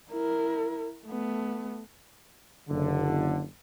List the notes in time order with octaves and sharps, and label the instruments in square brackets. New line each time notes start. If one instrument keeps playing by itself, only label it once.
[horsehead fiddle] E4 A#4
A3 B3
[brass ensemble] F#1 D3